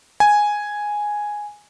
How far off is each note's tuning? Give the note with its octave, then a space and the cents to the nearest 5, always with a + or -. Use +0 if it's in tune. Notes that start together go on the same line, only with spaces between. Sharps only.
G#5 +0